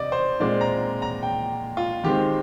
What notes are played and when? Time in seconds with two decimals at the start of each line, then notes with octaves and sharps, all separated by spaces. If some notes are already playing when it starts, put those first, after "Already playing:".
Already playing: C3 D5 D#5
0.12 C5
0.40 A#2 G#3 C4 D5
0.61 A#5
1.02 A#5
1.23 G5
1.77 F4
2.04 D#3 G#3 C4 G4